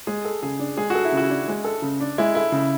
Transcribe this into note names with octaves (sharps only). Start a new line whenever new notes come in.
G#3 G#4
A4
C#3 G#4
D4
G#3 G#4
F#4 A4
E4
C#3
F#4
D4
G#3
A4
C#3
D4
G#3 E4
E4 A4
C#3